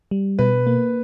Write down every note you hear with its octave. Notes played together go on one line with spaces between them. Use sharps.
G3
B2 B4
A#3